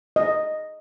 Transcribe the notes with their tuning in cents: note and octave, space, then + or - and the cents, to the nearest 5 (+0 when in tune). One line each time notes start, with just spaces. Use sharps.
D#5 -5